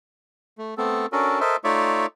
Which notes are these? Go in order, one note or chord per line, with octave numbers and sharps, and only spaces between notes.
A3
A3 B3 C4 A4
C#4 D4 F#4 A4 A#4
A4 A#4 C5 D#5 E5
A3 D#4 F4 C#5 D5 E5